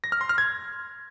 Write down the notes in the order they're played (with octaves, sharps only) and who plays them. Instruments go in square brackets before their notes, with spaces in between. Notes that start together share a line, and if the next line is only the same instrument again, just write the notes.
[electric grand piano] A#6
F6
C6
F6
G#6